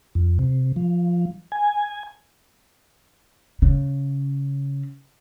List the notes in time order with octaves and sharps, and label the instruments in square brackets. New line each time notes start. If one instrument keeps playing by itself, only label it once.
[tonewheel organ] F2
C3
F3
G#5
[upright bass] C#3